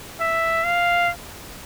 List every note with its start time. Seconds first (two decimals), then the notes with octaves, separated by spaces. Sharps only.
0.20 E5
0.64 F5